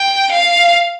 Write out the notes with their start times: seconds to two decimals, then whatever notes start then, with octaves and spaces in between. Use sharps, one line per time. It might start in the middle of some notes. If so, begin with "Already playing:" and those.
Already playing: G5
0.32 F5